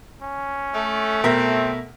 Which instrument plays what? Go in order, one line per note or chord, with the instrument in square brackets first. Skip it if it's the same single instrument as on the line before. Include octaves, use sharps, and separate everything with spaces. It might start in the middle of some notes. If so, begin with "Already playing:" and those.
[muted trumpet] C#4
[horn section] A3
[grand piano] B2 A#4 E5 [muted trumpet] C4